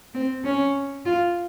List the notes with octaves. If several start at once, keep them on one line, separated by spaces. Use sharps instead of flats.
C4
C#4
F4